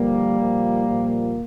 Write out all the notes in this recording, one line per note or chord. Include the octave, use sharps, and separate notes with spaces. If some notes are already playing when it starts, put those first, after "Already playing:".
Already playing: G2 D3 F3 G3 A#3
A#2 F3
A#2 F3